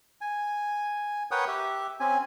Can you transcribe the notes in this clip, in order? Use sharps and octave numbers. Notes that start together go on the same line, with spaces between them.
G#5
A#4 B4 C#5 F#5 G5 D#6
G4 E5
C4 C#4 G#5